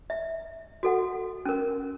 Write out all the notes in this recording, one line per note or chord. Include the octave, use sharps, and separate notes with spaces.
E5
F#4 A4 F#5
C#4 A#4